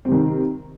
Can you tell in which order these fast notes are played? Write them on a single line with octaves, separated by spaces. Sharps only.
C4 C3 D#3